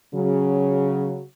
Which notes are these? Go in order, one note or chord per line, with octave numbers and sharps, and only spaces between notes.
C#3 F#3